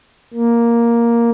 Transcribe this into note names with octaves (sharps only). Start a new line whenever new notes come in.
A#3